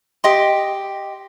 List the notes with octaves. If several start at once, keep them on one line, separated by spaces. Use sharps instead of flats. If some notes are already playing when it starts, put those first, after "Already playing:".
G4 D#5 C6